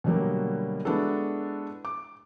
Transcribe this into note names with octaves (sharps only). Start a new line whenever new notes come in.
B2 D3 F#3 G3 A#3
G#3 B3 D4 E4 F#4 A4
D6